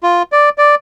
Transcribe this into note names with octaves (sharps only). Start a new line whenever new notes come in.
F4
D5
D5